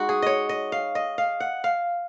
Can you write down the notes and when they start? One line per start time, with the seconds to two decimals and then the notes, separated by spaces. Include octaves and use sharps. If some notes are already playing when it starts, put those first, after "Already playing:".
Already playing: G#3 D#4 F#4
0.09 G#4
0.22 C#5 D#5
0.49 D#5
0.72 F5
0.95 D#5
1.18 F5
1.40 F#5
1.64 F5